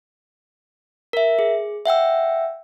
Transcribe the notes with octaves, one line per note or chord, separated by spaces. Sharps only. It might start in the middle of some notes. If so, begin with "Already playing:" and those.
A#4 E5
G#4
E5 F#5 G5 E6